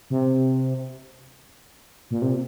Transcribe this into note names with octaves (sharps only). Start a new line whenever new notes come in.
C3
A#2
C3